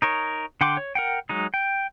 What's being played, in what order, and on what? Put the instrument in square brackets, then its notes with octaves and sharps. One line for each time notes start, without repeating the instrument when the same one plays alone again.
[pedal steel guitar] D#4 A#4 C#5
D3 F#5 G5 C6 D6
C#5
A#4 F#5 G5
F#3 G#3 D#4
G5